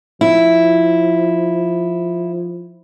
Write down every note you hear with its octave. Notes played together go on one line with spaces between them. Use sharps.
F3 E4